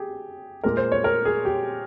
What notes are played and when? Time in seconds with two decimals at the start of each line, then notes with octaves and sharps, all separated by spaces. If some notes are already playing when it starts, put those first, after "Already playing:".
Already playing: G4 G#4
0.64 A#2 G#3 A#4
0.77 C5
0.92 C#5
1.04 A#4
1.25 G#4
1.45 G4